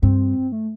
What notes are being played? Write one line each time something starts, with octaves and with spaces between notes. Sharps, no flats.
G2 C4
A3